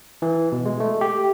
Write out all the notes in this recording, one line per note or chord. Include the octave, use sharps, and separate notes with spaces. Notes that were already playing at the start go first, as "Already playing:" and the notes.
E3
B2
G#3
A3
G4